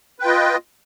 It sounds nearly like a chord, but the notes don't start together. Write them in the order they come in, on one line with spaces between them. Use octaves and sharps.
B4 G5 F4 D#5